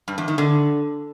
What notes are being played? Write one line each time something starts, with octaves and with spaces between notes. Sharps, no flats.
G2
E2
D#3
D3